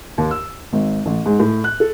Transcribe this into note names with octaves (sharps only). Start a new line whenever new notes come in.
D#2
E6
G#1
A1
G#2
A2
F#6
A4